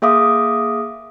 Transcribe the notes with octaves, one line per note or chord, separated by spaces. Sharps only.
A#3 G#4 E5 F5 D6 D#6